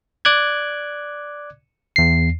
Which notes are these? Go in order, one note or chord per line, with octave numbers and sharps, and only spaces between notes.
D5 D6 F#6 G#6
E2 C7